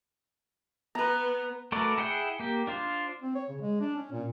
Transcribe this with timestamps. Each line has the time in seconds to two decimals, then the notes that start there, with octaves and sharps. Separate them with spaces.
0.95 B3 B4 A#5
1.72 A3 F#4 A#4 B4 D5
1.98 E4 G#4 F#5 G5
2.40 A#3 G4
2.67 D4 F4 C5
3.22 C4
3.35 C#5
3.49 C#3
3.61 G#3
3.81 D4
3.96 C#4
4.12 A#2